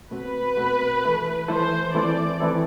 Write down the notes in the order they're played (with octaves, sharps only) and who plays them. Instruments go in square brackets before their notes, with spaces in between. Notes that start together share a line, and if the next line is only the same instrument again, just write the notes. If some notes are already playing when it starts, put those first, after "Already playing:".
[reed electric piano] B2 A3 C4 F#4 [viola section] B4
[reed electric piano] B2 A3 C4 F#4
E3 A3 E4 A4
[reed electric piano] E3 A3 E4 A4 [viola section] C5
[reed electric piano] E3 A3 C4 E4 A4 [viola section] D5
[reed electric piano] E3 A3 C4 E4 A4